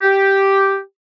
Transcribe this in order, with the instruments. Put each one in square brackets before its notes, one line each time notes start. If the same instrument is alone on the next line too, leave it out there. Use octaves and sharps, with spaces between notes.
[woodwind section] G4